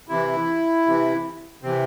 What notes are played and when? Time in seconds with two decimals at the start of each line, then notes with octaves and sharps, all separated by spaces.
0.09 C3 E3 E4
0.86 C3 E3
1.63 C3 E3 C4